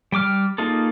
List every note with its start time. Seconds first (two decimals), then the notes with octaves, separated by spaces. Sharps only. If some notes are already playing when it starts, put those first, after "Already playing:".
0.12 G3 G5 D6 F6
0.58 A#3 D#4 F4 G#4 A4